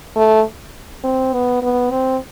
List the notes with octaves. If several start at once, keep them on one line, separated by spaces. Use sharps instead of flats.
A3
C4
B3
B3
C4